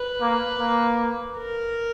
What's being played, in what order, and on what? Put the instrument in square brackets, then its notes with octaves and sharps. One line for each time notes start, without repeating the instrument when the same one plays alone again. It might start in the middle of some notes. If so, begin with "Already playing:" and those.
Already playing: [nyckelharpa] B4
[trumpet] A#3
A#3
[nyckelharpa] A#4